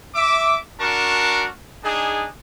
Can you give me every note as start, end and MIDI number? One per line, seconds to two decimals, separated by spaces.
0.15 0.55 76
0.15 0.55 86
0.79 1.47 62
0.79 1.47 66
0.79 1.47 70
0.79 1.47 81
0.79 1.47 85
1.84 2.26 62
1.84 2.26 63
1.84 2.26 68